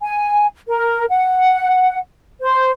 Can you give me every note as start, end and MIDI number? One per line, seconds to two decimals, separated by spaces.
0.01 0.46 80
0.67 1.04 70
1.10 1.98 78
2.41 2.71 72